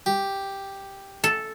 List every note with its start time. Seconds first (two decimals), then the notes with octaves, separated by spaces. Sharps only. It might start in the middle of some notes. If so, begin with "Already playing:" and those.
0.06 G4
1.24 A4